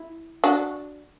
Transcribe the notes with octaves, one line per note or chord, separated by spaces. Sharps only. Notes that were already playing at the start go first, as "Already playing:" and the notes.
Already playing: E4
D4 F#4